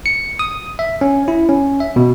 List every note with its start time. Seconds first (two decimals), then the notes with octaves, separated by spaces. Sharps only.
0.06 C#7
0.39 D#6
0.79 E5
1.01 C#4
1.28 E4
1.49 C#4
1.80 E5
1.96 B2